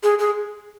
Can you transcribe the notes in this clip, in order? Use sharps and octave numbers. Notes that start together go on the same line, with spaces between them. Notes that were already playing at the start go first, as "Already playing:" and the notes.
G#4
G#4